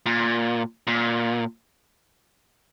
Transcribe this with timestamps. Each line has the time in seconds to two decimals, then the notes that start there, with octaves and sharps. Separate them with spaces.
0.06 A#2
0.87 A#2